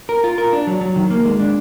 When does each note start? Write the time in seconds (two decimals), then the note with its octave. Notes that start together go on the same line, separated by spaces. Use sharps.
0.09 A#4
0.24 F4
0.38 A#4
0.53 D4
0.67 F#3
0.81 F#3
0.96 D#3
1.10 A#3
1.25 G#3
1.39 D4